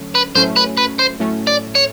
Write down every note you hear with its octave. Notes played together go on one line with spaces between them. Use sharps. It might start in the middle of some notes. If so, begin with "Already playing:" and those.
Already playing: D3 F#3 A3 C#4
B4
A2 F#3 A3 C#4 C5
B4
B4
C5
A2 F#3 A3 C#4
D5
C#5